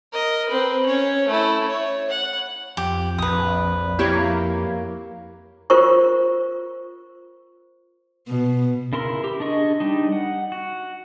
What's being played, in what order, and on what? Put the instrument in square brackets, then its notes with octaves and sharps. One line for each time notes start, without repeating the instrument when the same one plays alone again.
[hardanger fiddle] A#4 D#5
C4 B4
C#4 C#5
A3 E4
C#5
F#5
[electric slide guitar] F2 [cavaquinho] G4
[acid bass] A#1 [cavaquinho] B4 D#6
[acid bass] A#3 [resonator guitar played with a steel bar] E4 G4 C#5
[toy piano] F4 A#4 C5 C#6
[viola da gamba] B2
[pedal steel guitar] C#3 E4 A#4 C6
G4
D4 G#4 D#5 C#6
G3 D4 D#4
F#5
F#4